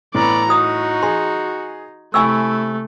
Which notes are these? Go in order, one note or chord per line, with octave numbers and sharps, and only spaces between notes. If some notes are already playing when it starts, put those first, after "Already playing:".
A2 E3 B3 D5 A#5
D#4 F#4 D#6
G#4 C6
C3 A3 E4 G#5 C#6 E6